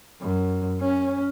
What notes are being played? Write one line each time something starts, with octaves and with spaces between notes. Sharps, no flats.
F#2
C#4